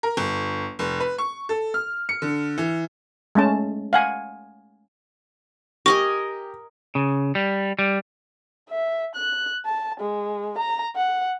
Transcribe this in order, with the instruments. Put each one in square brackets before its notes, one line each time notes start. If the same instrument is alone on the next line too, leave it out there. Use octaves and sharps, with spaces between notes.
[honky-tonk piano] A#4
G1
F1
B4
C#6
A4
F6
C#7
D3
E3
[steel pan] G#3 A3 C#4 A5
F5 F#5 G#5
[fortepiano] G4 [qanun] A#4 D#5 G#5 [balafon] C#6
[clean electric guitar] C#3
G3
G3
[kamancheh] E5
F#6
A5
G#3
A#5
F#5